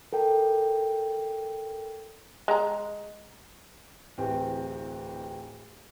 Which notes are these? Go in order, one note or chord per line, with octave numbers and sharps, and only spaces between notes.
A4 A#4 G5
G#3 A#5
D1 E3 C4 G4